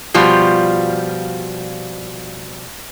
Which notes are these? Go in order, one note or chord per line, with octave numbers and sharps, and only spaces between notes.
B2 F3 G3 F4